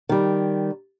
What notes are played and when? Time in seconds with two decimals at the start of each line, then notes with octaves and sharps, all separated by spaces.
0.09 D#3 G3